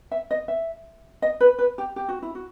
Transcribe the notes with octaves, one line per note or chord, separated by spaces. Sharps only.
E5
D#5
E5
D#5
B4
B4
G4
G4
F#4
E4
F#4